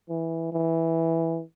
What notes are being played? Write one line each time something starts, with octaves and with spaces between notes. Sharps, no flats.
E3
E3